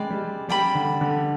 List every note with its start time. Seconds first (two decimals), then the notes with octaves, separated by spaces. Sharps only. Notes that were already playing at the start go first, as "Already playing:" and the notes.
Already playing: G#3 D5 G5 B5
0.10 G3
0.49 G3 D5 G5 B5
0.75 D3
1.01 D3